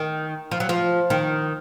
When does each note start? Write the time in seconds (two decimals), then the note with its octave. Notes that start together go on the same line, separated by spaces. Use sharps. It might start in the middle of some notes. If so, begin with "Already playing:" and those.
Already playing: D#3
0.51 F3
0.60 F#3
0.69 F3
1.10 D#3